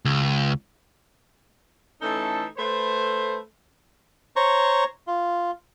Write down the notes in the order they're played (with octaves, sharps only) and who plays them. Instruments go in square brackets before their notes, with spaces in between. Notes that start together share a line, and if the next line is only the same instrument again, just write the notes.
[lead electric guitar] C#2
[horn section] E3 A3 C#4 D#4 A4
A3 B4 C5
[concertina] C5 C#5 A#5 C#6
F4